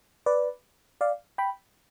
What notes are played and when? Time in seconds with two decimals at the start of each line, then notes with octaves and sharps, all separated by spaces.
0.26 B4 D5
1.01 D5 F5
1.38 G5 B5